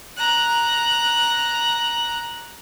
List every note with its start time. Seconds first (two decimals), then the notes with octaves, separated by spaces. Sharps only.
0.17 A#5 F#6